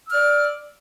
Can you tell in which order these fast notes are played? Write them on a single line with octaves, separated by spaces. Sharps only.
E6 F6 D5